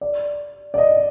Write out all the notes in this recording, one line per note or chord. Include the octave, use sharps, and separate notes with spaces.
D5
D5
D#5